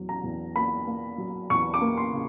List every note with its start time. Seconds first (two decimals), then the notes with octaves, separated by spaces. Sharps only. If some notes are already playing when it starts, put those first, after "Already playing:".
Already playing: E2 F#3
0.09 A#5
0.24 E2
0.56 A#3 B5
0.87 A#3
1.18 F#3
1.50 E2 C#6
1.74 D6
1.81 A#3
1.97 C6
2.13 C#3